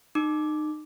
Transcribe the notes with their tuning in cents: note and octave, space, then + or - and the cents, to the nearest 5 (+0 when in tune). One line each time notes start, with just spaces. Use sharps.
D#4 -30 D6 +0